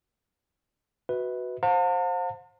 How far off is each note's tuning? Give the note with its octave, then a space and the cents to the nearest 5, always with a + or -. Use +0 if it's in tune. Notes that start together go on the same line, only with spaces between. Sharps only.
F#4 +0 B4 +0 E5 -45
C5 +10 F5 +45 A5 +45